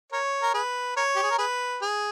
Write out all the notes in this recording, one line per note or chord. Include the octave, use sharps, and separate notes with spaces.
A#4 C#5
A#4
G#4 B4
A#4 C#5
G4
G#4
A#4
G#4 B4
G#4